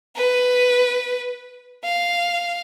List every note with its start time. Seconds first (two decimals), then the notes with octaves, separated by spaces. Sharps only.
0.16 B4
1.84 F5